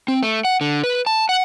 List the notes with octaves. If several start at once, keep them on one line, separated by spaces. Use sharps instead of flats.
C4
A3
F#5
D3
B4
A5
F#5